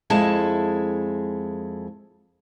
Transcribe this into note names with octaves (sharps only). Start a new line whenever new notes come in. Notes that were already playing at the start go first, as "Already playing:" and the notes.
F2 G#3 E4 A4 A5